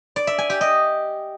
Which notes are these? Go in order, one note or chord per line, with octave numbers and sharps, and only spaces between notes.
D5
E5
G#5
G4
D#5